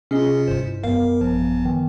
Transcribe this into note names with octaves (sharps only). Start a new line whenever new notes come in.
C3 C#4 F4 G#4 D#5
G2 E4 C5
F#2 B3 A#4 F5
A1 F3
D#3 E3